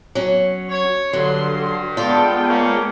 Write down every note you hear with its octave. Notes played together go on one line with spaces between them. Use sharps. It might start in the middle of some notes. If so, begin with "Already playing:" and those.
F#3 C#4
C#5
G2 D3 F#3 C6
G#3 B3 F4 A4 D5 G5
A#3 C#4